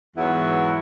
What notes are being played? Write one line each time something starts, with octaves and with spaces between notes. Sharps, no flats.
E2 G#2 F#3 B3 E4